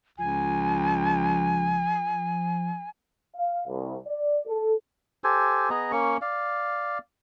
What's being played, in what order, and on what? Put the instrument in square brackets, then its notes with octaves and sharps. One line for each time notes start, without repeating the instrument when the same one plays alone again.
[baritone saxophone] C#2 [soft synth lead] F3 [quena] G#5
[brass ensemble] F5
C2
D5
A4
[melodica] G4 A4 C5 G#5
B3 G#4 D#5 A#5
A#3 C#4 C#6
D5 F5